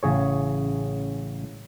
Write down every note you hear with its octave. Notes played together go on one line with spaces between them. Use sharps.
A1 C#3 G#4 C#5